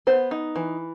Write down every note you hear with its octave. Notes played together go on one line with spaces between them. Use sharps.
B3 C5
D#4
E3